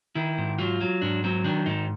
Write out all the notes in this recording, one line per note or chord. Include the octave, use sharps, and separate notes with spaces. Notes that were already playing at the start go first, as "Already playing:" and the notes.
D#3 E4
G#2
F#3 F4
F#3
G#2 D4
F#3 C4
D#3 D4
G#2 D#4